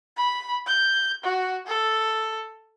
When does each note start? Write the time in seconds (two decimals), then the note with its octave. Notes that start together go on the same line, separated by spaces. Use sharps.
0.17 B5
0.67 G6
1.24 F#4
1.67 A4